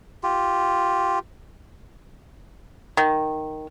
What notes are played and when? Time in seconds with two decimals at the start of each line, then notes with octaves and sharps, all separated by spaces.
0.23 F4 G4
2.97 D#3